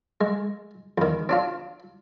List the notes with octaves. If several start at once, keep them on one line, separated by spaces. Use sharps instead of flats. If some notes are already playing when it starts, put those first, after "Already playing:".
G#3
E2 D#3
C4 D4 F4